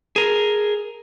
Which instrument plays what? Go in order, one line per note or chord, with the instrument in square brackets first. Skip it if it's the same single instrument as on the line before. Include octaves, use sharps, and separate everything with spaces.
[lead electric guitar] G#4 A#4